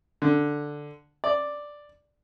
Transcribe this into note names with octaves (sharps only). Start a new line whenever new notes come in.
D3
D5